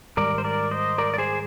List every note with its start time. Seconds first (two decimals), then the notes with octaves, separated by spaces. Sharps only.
0.17 G#2 D#3 G3 A#4 D5
0.38 C5
0.44 A#4 D5
0.71 C5 D#5
0.98 A#4 D5
1.14 D5
1.18 G#4 C5